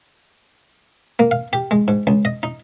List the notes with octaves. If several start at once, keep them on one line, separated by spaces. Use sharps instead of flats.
A#3
F5
G4
G#3
G#2
C#2
D#5
D#4